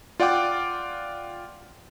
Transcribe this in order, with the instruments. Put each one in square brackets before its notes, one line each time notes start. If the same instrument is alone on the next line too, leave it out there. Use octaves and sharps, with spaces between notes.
[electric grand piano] F4 D5 F#5 G5 D6